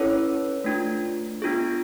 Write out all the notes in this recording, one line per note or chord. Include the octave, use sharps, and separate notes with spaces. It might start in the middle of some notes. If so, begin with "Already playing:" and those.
Already playing: C#4 E4 A4 B4 C#5
A3 D4 F4
B3 D4 F4 G#4